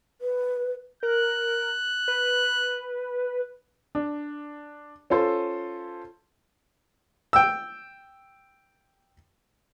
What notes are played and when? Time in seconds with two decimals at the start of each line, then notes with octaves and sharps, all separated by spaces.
0.21 B4
1.03 A#4 F#6
2.08 B4
3.95 D4
5.10 C#4 F4 A4 C5
7.33 G5 E6